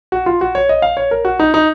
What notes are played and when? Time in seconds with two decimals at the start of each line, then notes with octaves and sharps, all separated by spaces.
0.12 F#4
0.26 F4
0.41 F#4
0.55 C#5
0.69 D#5
0.82 F5
0.97 C#5
1.11 A#4
1.25 F#4
1.40 D#4
1.54 D#4